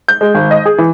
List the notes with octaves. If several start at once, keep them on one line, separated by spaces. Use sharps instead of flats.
G6
G#3
G#1
D#5
G#4
E3